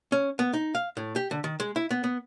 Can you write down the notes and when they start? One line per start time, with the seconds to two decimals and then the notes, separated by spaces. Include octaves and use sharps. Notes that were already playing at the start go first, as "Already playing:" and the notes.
0.12 C#4
0.39 B3
0.53 D#4
0.75 F5
0.97 A2
1.16 G4
1.31 D3
1.44 D#3
1.60 G#3
1.76 E4
1.91 B3
2.04 B3